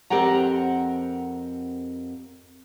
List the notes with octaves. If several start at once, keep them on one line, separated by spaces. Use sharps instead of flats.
F2 C4 G4 A#4 F#5 A#5